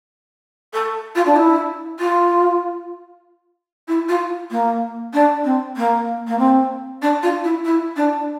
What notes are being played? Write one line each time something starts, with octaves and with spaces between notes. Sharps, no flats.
A4
F4
D4
E4
F4
E4
F4
A#3
D4
C4
A#3
A#3
C4
D4
F4
E4
E4
D4